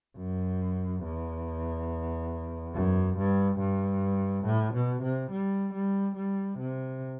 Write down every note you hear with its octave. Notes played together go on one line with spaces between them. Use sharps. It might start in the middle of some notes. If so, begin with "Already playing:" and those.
F#2
E2
F#2
G2
G2
A2
B2
C3
G3
G3
G3
C3